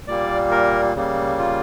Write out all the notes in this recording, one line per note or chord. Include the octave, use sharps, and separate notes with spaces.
A#2 G3 A#3 D5
A#4
C#3 G3 A#3
F4